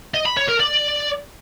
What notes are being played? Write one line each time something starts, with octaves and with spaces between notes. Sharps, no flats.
D#5
B5
C#5
A#4
D5